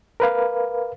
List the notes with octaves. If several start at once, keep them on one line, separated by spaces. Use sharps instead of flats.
A#4 B4 F5